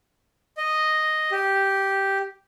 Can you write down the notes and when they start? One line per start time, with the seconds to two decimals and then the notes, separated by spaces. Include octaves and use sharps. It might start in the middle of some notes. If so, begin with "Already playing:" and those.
0.57 D#5
1.31 G4